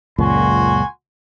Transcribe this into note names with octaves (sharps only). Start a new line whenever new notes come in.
C#2 F#2 A#2 F#4 G#5 C6